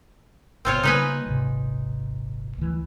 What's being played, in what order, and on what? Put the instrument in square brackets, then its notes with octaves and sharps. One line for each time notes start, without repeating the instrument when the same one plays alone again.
[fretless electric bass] G1 B2 [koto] C4 F4 C#5
[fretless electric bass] C#3 G3 A#3 [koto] D#4 B4 G#5
[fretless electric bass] D#1 G#1 C3
D2 E3